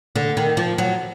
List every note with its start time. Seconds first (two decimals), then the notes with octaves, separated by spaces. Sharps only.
0.16 D3
0.37 D#3
0.57 F3
0.78 F#3